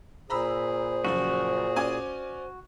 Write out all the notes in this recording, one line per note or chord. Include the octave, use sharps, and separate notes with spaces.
A#2 G#4 C5 A#5 B5 E6
F#2 C#3 F3 F#4
C#4 D5 G#5